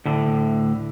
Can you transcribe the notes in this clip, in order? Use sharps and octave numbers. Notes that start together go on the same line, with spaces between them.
D2 A2 D3